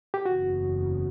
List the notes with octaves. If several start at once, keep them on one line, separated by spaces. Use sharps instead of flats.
G4
F#1 E2 C#3 F#4